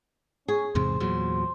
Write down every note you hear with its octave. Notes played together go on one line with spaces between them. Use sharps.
C#4 G#4
E2 G#2 C3 C5
E2 A#2 F#3 C5